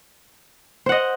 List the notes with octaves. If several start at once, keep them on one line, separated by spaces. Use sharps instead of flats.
C5 D#5 F#5